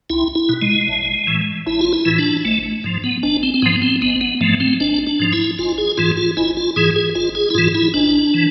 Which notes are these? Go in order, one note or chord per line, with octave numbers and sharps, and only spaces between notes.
C2 E4
E4
B2
G#3
A1
A2 E3
A1 E4
F4
E4
A2 E3
D4
G#1 A3
G#2 F3
B3
G#1 D4
C4
C4
G#2 F3 B3
C4
G#1 B3
B3
G#2 F3 A3
C4
G#1 D4
D4
G#2 F3
E4
G#1 F4
G#4
G#2 E3 F4
F4
G#1 E4
F4
G#2 E3 G#4
G#4
G#1 F4
G#4
E4
G#2 E3 F4
E4
G#1 D4
E3